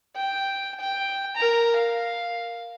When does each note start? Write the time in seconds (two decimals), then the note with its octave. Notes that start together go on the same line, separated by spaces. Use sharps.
0.17 G5
0.80 G5
1.37 A#4 A#5
1.76 F5